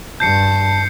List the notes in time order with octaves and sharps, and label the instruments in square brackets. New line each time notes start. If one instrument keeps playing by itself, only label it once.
[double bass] G2 [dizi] A5 [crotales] G6 C7 C#7